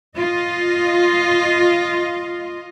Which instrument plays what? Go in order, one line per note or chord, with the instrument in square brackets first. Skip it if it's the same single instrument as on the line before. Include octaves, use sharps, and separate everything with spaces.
[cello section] F4 D#5